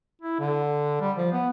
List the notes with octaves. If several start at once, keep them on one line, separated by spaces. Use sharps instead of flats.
E4
D3
G3
F3
B3